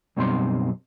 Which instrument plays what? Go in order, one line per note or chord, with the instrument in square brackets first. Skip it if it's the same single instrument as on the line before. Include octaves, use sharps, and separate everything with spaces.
[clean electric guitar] F#2 B2 G3 C4 D#4 C6